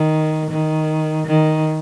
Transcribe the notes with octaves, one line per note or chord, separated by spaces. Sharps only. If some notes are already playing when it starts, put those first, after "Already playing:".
Already playing: D#3
D#3
D#3